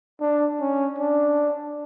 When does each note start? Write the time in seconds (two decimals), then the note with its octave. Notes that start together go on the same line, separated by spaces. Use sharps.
0.21 D4
0.60 C#4
0.99 D4